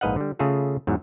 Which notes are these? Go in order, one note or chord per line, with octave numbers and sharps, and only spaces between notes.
A#1 G#2 B4 D#5 F5 F#5
D3 G3
C#3 A3 F4 G#4 A4
E2 G#2 F#3